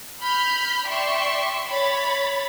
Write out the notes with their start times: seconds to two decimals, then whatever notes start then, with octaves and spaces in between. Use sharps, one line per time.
0.22 B5 F6 G6
0.88 D5 E5 G5 C6 C#6
1.68 C#5 B5 A6